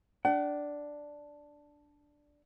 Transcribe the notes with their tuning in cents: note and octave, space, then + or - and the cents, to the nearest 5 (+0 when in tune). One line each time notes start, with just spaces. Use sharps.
D4 +0 F#5 +45